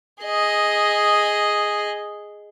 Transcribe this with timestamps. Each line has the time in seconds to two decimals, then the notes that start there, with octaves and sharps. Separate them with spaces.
0.23 G#4 D#5